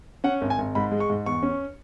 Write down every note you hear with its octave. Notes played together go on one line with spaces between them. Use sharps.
C#4 F#5
G#1
G#5
G#1
G#2 B5
G#3
C#6
G#2
E2 C#6
C#4